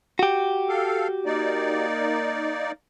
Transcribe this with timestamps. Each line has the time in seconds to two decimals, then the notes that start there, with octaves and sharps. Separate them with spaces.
0.19 F#4 G4
0.69 A4 F5
1.26 A#3 D#4 D5